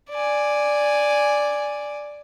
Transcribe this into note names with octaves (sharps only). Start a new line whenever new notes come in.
D5 G#5